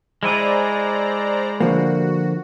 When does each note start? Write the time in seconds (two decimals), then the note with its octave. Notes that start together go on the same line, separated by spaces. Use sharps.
0.23 G#3 E4 C5 D5 G#5 A#5
1.60 D3 F3 A#3 F#4